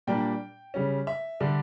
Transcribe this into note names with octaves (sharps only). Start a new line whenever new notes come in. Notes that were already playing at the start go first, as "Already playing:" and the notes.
A#2 G3 A#3 D4 G5
C#3 G3 C#4
E5
D3 G3 D4